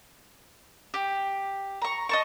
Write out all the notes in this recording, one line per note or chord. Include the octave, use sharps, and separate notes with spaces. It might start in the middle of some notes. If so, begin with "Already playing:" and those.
G4
A#5 C#6
D#5 A5 C#6